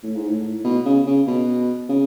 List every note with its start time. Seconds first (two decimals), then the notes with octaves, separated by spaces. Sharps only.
0.03 A2
0.15 G#2
0.28 A2
0.64 B2
0.85 C#3
1.06 C#3
1.27 B2
1.89 C#3